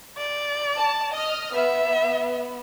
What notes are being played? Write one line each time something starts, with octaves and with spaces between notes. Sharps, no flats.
D5
A5
D#5 F6
B3 E5